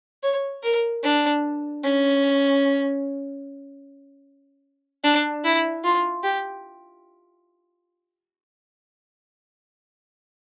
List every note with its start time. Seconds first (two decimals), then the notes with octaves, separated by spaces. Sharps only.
0.23 C#5
0.63 A#4
1.04 D4
1.84 C#4
5.04 D4
5.44 E4
5.84 F4
6.23 G4